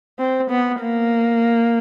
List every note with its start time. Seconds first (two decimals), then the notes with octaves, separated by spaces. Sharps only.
0.19 C4
0.50 B3
0.81 A#3